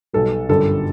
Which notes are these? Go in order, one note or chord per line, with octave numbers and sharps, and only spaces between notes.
B1 B2 G3 A4
G1 F#2 D3 G3 A4